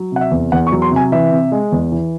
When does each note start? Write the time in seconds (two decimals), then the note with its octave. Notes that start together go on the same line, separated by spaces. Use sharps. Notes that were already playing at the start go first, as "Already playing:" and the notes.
Already playing: F#3
0.12 C3 F#5
0.21 E5
0.31 E2
0.52 E2 F#5
0.67 C#6
0.72 F#3
0.82 C6
0.91 C3 G#5
1.12 E3 E5
1.32 C3
1.52 G#3
1.72 E2
1.92 E3